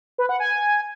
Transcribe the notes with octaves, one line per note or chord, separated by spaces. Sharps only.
B4
F#5
G#5